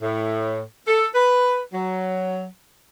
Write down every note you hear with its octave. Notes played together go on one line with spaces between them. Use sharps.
A2
A4
B4
F#3